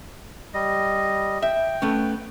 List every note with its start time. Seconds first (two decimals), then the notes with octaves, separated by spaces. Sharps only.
0.54 G3 D#5
1.42 E5 G5
1.82 A3 B3 C#4